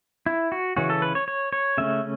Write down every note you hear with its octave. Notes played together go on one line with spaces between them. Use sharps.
E4
F#4
C#3 E3 C#4 F#4
A4
B4
C#5
C#5
C#5
C#3 A3 C#4 E5